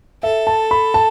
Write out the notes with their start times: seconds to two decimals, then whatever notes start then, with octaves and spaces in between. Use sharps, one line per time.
0.23 A4 E5
0.47 A5
0.71 B5
0.94 A5